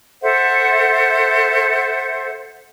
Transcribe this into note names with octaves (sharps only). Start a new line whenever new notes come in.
A4 C5 E5 F#5